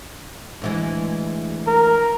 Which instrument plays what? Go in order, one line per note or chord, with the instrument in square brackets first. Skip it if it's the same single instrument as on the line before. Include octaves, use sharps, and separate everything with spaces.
[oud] D2 E3 G#3
[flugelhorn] A#4